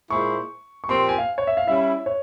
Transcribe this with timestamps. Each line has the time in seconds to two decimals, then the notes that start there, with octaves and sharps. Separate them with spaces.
0.10 A#2 G#3 E4 G#4 C5 C#6
0.84 C#6
0.89 A#2 F3 C4 G4 C6
1.09 G#5
1.18 F5
1.38 C#5
1.47 E5
1.57 F5
1.67 G3 C#4 E4 E5
2.06 C#5